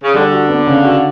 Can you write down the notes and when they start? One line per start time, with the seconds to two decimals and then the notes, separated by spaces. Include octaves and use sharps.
0.03 C#3
0.14 D3 G3
0.32 F#4
0.49 B3
0.67 C#3
0.85 F#4